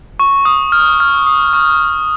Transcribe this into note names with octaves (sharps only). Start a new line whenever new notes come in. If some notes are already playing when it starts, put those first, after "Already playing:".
C#6
D#6
F6
F6
D#6
C#6